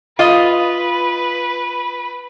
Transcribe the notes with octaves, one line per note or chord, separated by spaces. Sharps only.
F4 B4 D#5